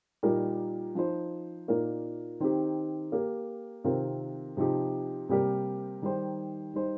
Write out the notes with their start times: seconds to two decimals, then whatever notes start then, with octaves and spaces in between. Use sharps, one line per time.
0.23 A#2 G3 D#4 G4 A#4
0.95 F3 D#4 C5
1.68 A#2 A#3 D#4 A#4
2.40 D#3 C4 D#4 G4
3.12 A#3 G4 A#4
3.84 C3 D#3 C4 F4 A#4
4.57 C3 F3 D#4 G4
5.29 C3 G3 A#3 G4 A#4
6.02 D#3 G3 D#4 C5
6.74 G3 D#4 C5